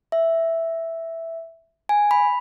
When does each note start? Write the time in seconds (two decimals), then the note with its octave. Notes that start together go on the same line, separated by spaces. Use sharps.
0.12 E5
1.89 G#5
2.11 B5